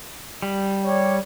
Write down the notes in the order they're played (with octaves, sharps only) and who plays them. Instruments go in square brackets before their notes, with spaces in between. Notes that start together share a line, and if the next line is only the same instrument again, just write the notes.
[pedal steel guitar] G3
[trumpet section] G4 C#5 D5